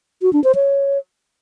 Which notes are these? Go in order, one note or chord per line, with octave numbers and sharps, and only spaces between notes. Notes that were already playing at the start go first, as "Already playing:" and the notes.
F#4
D4
C5
C#5